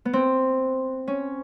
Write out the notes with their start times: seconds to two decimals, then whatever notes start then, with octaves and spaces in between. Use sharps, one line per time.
0.05 B3
0.13 C4
1.08 C#4